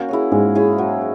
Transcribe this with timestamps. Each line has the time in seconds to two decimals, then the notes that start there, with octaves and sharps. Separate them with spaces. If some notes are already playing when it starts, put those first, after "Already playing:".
Already playing: A#3 C#4 F#4
0.08 E4 G#4 C#5
0.32 G#2 G#3 A#3
0.55 E4 G#4 C#5
0.78 F#3